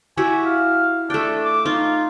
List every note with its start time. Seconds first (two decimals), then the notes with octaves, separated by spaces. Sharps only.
0.17 E4 F#4 G4 G#5
0.46 F5
1.10 A3 D4 G5
1.45 D6
1.66 D#4 F4